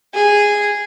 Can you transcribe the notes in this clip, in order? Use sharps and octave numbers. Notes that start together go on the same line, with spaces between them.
G#4